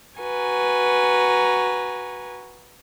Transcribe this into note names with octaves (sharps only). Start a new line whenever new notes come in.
F#4 B4 G#5 A#5